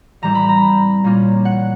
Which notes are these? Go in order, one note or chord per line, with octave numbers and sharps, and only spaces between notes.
A2 E3 G3 C4 E4 A#5
B5
A#5
A#2 G3 A#3 C#4
F#5